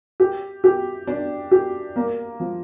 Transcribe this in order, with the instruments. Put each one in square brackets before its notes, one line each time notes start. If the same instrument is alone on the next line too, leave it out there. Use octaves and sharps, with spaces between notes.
[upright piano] G4
G4
D4
G4
A#3
F3